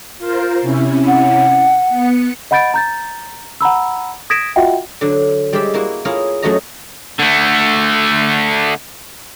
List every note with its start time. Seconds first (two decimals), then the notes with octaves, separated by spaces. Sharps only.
0.18 F4 A#4 C5
0.62 C3 C#4 E4
1.07 F#5
1.89 B3 C#7
2.51 D#5 F#5 B5 G6 A6 D7
2.74 A#5 G6 A6
3.61 F#5 A#5 B5 E6
4.30 D#6 G#6 A#6 B6 D7 E7
4.56 F4 F#4 D#5 E5 F#5 G5
5.01 D3 F#3
5.53 G3 G#3 C5 D5 E5
5.74 A#3 E4 F#4
6.05 E4 F4 G#4 A#4 C#5 F5
6.42 F#2 F#3 A3 F#4 D#5 A#5
7.19 D3 A3